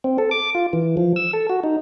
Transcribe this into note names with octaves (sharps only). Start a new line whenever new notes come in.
C4
A4
D6
F4
E3
F3
E6
A4
F#4
D#4